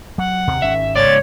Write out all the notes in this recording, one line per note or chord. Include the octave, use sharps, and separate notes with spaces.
F#3 F#5
D#2 C3 C4
G#1 D#3 C#4 E5
G#2 C#3 C#5 D5 A6